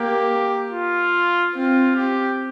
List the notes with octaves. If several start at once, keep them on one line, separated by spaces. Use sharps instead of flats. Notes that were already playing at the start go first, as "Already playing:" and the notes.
Already playing: A#3 G4
F4
C4 F4
G4